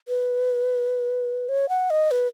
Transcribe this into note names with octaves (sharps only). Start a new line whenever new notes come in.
B4
C#5
F#5
D#5
B4